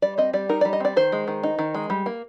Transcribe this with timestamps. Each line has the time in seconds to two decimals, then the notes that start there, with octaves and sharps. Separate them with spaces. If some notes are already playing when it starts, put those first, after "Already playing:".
0.02 G3 D5
0.18 C4 D#5
0.33 G3 D5
0.49 D#4 A#4
0.61 G3 D5
0.73 D#5
0.80 C4 D5
0.96 D#3 C5
1.12 G#3
1.28 D#3
1.43 D#4
1.59 D#3
1.75 G#3
1.90 G3
2.06 A#3